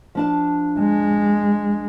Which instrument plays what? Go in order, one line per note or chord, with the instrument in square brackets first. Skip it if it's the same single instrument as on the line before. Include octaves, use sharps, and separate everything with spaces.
[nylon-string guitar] F3 D4 A5
[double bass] G#3